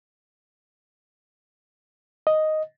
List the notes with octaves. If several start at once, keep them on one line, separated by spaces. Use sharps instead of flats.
D#5